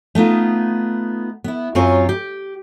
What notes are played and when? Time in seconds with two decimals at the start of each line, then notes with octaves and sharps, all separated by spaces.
0.15 A3 B3 D#4 F4
1.44 B3 E4
1.75 F#2 F#3 C4 F4 C#5 G#5
2.09 G4